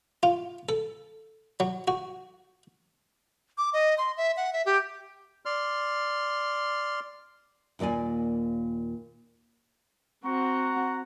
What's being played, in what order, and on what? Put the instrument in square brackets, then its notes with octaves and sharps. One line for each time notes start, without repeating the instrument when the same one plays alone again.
[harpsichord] F4
A4
F#3
F#4
[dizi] D6
D#5
C6
E5
F#5
E5
G4
[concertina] D5 C6 F6
[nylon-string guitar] D#2 A#2 A#3 D5 G#5
[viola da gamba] C4 F#4 [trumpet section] F#5 A#5 [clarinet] C#6